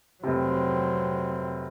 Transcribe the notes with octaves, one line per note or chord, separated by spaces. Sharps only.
F1 C3 F#3 C4